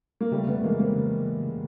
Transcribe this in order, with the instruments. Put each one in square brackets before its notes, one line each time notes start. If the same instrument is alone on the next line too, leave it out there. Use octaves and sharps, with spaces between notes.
[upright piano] A#3
[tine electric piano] C#3 [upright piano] G3 A3
[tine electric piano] C#3 [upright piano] A3 B3
[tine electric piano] E3 [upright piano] G#3 A#3
[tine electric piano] A3 [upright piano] A#3 C4
[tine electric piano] C#3
E3
A3
C#3